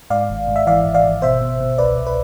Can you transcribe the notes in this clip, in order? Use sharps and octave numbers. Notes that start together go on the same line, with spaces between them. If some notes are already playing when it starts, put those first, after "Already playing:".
G#2 D5 F5
G#1
G#2
E5
E3 D5 F5
G#1
D5 F5
G#1
B2 C5 E5
B2
B2
C2 B4 D5
C2
B4